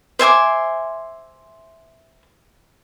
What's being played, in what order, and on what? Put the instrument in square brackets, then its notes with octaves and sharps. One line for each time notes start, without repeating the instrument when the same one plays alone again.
[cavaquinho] C5 E5 G#5 D6